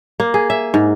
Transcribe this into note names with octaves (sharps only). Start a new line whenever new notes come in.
A#3
G#4
E5
G#2